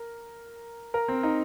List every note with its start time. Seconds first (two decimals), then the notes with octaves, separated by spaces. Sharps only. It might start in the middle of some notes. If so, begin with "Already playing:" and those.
Already playing: A#4
0.94 A#4
1.08 C4
1.23 D#4